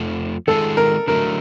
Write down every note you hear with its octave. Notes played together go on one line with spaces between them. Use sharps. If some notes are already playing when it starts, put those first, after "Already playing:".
Already playing: F2 F3 A3
D#3 G#3 C4 F4 G#4 A4
A#4
D3 F#3 A3 A#4